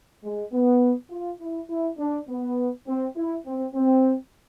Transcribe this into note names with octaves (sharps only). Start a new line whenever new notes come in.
G#3
B3
F4
E4
E4
D4
B3
C4
E4
C4
C4